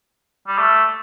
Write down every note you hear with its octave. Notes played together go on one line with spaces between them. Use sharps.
G3
A3